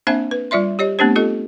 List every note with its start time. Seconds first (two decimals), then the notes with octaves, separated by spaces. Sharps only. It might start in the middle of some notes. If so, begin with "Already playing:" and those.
0.07 A#3 C4 D4 C5 E5 G#5
0.31 B4
0.51 G3 F4 D5 E5 C6
0.79 G4 C#5 D#5
0.99 A3 B3 C4 D4 G4 C5
1.16 F4 G4 A4 D#5